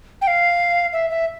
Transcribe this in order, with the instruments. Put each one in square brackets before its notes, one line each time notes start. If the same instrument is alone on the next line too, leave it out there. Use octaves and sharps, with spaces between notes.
[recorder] G5
F5
E5
E5